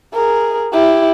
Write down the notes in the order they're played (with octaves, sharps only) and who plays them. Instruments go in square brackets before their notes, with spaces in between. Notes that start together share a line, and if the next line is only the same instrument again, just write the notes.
[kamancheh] G#4 A#4
E4 G4